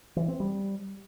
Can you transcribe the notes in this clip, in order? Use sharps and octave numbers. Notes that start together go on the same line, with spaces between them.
E3
C4
G3